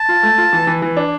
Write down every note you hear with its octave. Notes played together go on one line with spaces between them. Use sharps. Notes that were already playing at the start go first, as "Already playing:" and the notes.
Already playing: A5
F4
A3
F4
E3
E3
E3
D4